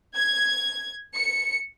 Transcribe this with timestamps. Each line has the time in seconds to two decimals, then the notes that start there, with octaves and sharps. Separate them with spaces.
0.16 G#6
1.15 C#7